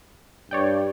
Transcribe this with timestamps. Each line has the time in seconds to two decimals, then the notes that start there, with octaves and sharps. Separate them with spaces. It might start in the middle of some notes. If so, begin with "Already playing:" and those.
0.51 G2 C#5 D5 G5